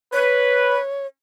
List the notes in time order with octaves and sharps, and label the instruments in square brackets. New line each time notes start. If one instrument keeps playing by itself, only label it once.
[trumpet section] B4 [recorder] C#5